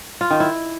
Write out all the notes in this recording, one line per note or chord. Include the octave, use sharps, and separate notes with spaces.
F4
D#3
E4